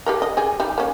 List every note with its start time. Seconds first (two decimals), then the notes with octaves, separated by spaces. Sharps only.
0.06 G4 A4 A#4
0.22 D#5
0.37 G4 G#4 G#5
0.60 G3 D#4
0.78 A#3 C#4